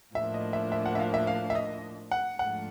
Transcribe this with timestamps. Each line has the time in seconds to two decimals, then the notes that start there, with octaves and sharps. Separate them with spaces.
0.15 A2 F3 A#3 D4 E5
0.34 D#5
0.53 E5
0.72 E5
0.86 F#5
0.95 E5
0.99 F5
1.14 E5
1.27 F5
1.50 E5
1.55 D#5
2.11 F#5
2.39 G#2 F3 A3 D4 F4 F#5